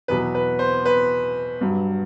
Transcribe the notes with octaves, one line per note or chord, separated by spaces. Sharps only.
E2 B2 F#3 B4
B4
C5
B4
G2 F#3